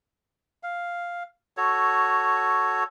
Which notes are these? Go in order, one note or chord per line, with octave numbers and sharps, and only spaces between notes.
F5
F#4 A4 C#5